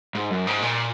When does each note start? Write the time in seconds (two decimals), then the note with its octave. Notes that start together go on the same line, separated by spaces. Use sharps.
0.15 G#2
0.30 F#2
0.47 G#2
0.62 A#2